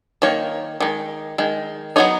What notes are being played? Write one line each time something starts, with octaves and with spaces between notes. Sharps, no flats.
D#3 A#3 C#5
D#3 G#3
D#3 G#3
F#3 B3 D#4 C#5